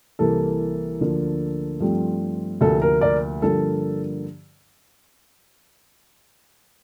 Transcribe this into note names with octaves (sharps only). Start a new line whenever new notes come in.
C2 C3 E3 A#3 A4
D2 D3 F3 A#3
G2 F3 A3 C4
D2 C3 F3 A#3 A4
A#4
A#4 D5
G2 D3 F3 A#3 A4